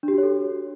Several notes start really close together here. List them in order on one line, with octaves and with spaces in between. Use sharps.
D4 G4 F#4 C#5 A4